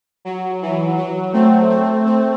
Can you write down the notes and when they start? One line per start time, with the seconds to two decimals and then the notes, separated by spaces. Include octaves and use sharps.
0.25 F#3
0.62 E3
0.98 F#3
1.33 A3 C4
1.69 A3 C4
2.06 A3 C4